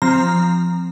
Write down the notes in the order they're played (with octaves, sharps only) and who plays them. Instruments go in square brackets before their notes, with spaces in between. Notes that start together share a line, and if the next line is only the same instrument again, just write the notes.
[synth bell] F3 C4 A#5